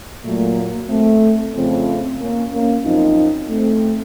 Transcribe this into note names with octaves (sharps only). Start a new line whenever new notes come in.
A#2 F#3 A3
A#3
A3 C4
F2 C#3 F3 A3 C4
A#3 C#4
A#3 C#4
F#2 F3 C4 D#4
A3 C4